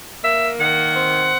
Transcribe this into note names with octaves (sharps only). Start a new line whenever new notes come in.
A#3 E5
D#3 F#5
C4